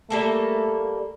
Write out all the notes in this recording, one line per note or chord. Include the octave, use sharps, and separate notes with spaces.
G3 A3 A#3 A4